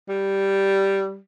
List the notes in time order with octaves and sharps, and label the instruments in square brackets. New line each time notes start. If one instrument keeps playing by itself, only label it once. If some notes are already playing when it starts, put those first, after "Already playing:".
[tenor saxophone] G3